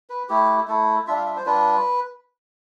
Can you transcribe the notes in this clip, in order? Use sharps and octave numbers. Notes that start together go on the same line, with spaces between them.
B4
A3 E4 G4
A3 E4 A4
G3 D4 F4 E5
F5
E5
C5
G3 D4 F4 B4